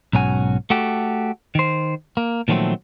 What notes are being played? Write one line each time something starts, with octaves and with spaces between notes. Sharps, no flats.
B1 G#2 C#4 F#4 G#5
A3 F#4 G4 A4
D#3 C5
A#3
A#2 D#3 F3 F#3 A3 C4